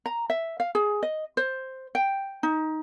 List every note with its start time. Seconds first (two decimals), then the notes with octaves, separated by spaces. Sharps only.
0.06 A#5
0.30 E5
0.60 F5
0.75 G#4
1.03 D#5
1.37 C5
1.95 G5
2.43 D#4